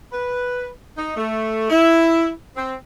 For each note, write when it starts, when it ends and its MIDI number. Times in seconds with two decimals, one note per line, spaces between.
0.12 0.68 71
0.98 1.15 63
1.16 1.66 57
1.70 2.30 64
2.56 2.76 60